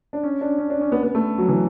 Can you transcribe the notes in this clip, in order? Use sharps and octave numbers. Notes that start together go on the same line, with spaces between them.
D4
C#4
D4
C#4
D4
C#4
B3
B3
A3
F#3
E3